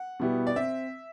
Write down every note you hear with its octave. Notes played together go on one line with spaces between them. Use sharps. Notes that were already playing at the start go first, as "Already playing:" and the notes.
Already playing: F#5
B2 G3 B3 E4 G4
D5
C4 E5